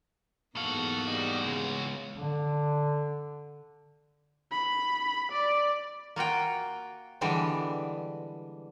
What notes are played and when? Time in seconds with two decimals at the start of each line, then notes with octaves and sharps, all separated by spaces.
0.56 E2 G#2 E3 A#3 F#4 A4 F5
1.08 G3 D#5
1.42 C#3 G#3
2.17 D3
4.51 B5
5.32 D5
6.16 A#3 F4 F#4 G5
7.21 D3 E3 G3 G#3 B3